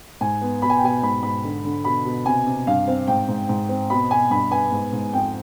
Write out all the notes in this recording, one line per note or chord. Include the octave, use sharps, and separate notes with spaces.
G#2 G#5
B3
B2 B5
G#5
G5
B2 G#5
G#2 B5
G#2 B5
D3
D3
B2 B5
B2
C3 G#5
C3
G2 F5
C4
G#2 G5
G#2
G#2
C4
B2 B5
B2 G#5
G2 B5
B3 G#5
G#2
G#2
F2 G5